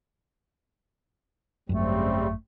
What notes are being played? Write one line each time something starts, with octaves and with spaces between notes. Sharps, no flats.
G#1 F#2 C#3 G3 A3 C4